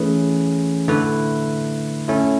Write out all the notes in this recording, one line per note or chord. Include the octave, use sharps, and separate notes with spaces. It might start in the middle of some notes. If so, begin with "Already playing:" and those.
Already playing: E3 A3 C#4 G#4 B4
D3 A3 E4 B4
A3 C#4 E4